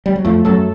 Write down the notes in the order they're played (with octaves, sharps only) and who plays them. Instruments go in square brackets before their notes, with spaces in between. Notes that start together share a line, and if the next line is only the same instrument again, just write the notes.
[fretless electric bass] G3
F#3
[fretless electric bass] F2 F3 [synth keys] A3
[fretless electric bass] F#2 F#3 [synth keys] A4